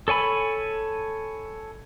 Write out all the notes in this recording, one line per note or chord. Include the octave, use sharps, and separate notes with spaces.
A4 C#5 G#5 B5